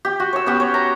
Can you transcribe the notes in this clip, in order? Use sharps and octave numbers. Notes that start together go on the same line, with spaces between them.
G4
F#4
C#5 E6
B3 C#4 F#4 G4
C#5
A#5